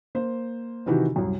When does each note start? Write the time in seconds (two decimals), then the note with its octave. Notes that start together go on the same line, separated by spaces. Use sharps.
0.15 A#3 C5
0.86 C3 D#3 E3 F#4 G4
1.16 C2 F#2